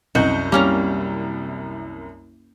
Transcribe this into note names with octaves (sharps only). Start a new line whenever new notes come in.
C2 F#2 F#4 D#5 G6
G3 A#3 C#4 A#5